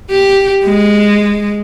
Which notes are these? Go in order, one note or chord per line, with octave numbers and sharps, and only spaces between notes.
G4
G#3